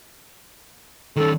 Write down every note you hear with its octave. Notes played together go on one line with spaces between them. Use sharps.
D#3 C#4 A4